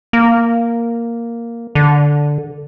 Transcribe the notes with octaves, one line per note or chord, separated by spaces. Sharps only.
A#3
D3